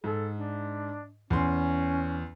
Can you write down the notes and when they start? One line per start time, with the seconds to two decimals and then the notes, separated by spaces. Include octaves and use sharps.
0.04 G#2 A4
0.36 D4
1.30 E2 C#4 C6